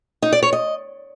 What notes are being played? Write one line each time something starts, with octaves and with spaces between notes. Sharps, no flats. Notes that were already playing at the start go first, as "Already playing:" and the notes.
D#4
D5
C#5
D#5